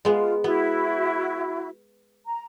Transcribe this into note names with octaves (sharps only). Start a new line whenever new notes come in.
G#3 B3 F4
B3 E4 F#4
A#5